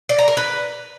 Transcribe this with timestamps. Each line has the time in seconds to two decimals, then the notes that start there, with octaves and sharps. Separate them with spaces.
0.09 D5
0.19 A#5
0.28 A#4
0.37 B4